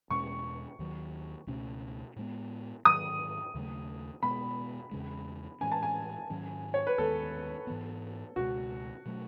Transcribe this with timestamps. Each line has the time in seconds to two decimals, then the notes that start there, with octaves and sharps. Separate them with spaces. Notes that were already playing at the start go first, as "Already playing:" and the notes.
0.10 E2 B2 G#3 C#4 C#6
0.79 D#2 D#3 F#3
1.47 C#2 B2 A3 C#4
2.16 A2 G#3 B3
2.85 G#2 D#3 F#3 D#6
3.54 D#2 C#3 F#3 A3
4.22 B2 G#3 B3 B5
4.91 E2 C#3 G#3
5.61 A2 E3 G#3 C#4 G#5
5.72 A5
5.83 G#5
6.30 G#2 D#3 F#3 C#4
6.74 C#5
6.87 B4
6.98 D#2 D#3 G#3 B3 A4
7.67 G#2 E3 B3
8.36 C#2 B2 G#3 F#4
9.06 B2 F#3 A3